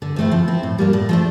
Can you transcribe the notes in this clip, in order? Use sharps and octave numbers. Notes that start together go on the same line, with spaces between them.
D3
F3 A3 C4 E4
F3
C4 E4
A2
G3 A#3 D4
A2
F3 A3 D4